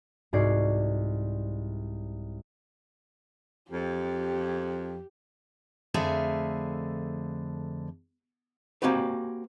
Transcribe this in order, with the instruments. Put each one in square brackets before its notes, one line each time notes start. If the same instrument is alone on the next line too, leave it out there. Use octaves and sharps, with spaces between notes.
[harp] C2 G#2 F#4 D5 G#6 C7
[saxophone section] F2 [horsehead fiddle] G4
[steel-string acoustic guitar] F2 D3 A3 G#4 E5 F5
[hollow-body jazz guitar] A#3 C4 F#4 G4 B4